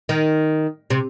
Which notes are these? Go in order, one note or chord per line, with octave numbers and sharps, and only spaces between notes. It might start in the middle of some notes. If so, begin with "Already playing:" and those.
D#3
C3